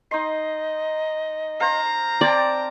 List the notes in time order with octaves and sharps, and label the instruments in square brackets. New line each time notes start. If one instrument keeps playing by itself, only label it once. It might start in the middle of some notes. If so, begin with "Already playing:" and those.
[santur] D#4 C6 [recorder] D#5
[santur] C5 F5 [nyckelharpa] A#5
[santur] C4 G5 A5 [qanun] D5